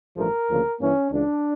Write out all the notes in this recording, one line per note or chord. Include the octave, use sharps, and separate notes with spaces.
A1 G2 F3 A3 A#4
D2 C#3 F3 A#3
G2 E3 A#3 C#4
C#2 C#3 E3 D4